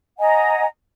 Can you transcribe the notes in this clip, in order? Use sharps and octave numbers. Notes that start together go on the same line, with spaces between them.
D#5 F#5 G#5 A#5